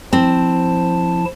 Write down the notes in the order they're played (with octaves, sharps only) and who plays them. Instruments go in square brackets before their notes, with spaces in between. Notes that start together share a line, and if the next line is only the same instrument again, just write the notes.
[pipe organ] F3 E4 A5 [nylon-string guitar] C4